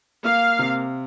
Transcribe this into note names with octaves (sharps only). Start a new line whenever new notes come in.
A#3 F5
C3